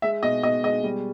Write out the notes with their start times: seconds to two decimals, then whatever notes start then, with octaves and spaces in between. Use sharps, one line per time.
0.02 G#3 E5
0.23 B2 D#5
0.43 B2 D#5
0.64 G#3 D#5
0.84 G3